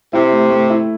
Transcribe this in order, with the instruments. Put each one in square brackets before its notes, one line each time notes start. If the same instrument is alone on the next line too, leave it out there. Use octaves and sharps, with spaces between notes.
[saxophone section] C3 [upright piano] E4
[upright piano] A3
A3
E4